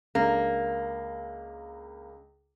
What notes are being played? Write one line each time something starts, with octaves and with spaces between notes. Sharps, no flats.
C#2 A#3 D4